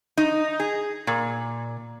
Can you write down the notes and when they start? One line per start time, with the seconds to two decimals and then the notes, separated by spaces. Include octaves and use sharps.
0.17 D#4
0.60 G#4
1.07 A#2